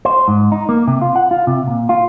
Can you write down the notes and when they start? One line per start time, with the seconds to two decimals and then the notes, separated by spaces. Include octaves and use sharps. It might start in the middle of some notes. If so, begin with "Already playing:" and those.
0.05 C5
0.28 G#2
0.52 D#4
0.69 A#3
0.87 C3
1.01 F4
1.16 F#5
1.31 F4
1.47 C3
1.67 A#2
1.89 F4